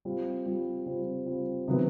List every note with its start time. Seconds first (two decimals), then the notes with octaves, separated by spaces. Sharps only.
0.05 G3 C4 F4
0.46 G3 C4 F4
0.86 G3 C4 F4
1.26 G3 C4 F4
1.68 C3 D#3 F#3 B3